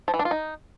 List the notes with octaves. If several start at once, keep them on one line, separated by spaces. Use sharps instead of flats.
F3
E3
D4
F4
D#4